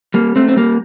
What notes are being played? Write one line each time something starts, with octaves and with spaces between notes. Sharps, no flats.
G3 A#3
A3 C4
C4
G3 A#3